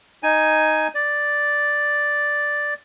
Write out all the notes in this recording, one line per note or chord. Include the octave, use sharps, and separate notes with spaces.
D#4 G#5
D5